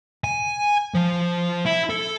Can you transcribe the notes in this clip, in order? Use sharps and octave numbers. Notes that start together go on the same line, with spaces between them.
G#5
F3
E4
A4